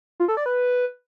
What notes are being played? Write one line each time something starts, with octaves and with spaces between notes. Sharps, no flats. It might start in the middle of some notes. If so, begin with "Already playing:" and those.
F4
A4
D5
B4